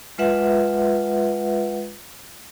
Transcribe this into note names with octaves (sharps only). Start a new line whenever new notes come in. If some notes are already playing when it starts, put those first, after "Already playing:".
G#3 F4 B4 E5 F#5